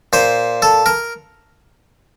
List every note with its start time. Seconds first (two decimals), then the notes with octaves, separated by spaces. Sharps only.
0.13 A#2 C5
0.62 A4
0.86 A#4